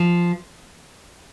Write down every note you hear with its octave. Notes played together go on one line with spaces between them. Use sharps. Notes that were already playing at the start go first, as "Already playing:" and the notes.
Already playing: F3